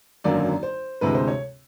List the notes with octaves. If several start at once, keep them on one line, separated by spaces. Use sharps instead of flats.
G#1 F#2 D3 F#3 A#3 D5
C5
D2 C3 E3 G#3 B4
C5
C#5